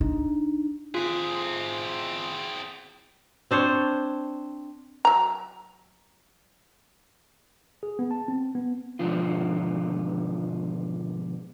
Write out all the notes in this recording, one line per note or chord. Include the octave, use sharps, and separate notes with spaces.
D4 D#4
C4 F4 G#4 B6
C4 D4 C5 C#5
F#3 A#5
G#4
B3
A5
C4
B3
G#2 B2 D3 F3 F4